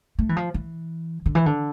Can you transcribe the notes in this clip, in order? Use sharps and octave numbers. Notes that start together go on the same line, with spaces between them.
A3
E3
F3
E3
D3
E3
D3